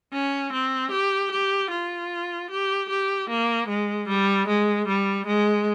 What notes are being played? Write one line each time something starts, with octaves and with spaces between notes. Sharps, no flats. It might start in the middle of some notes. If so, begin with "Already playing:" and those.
C#4
C4
G4
G4
F4
G4
G4
A#3
G#3
G3
G#3
G3
G#3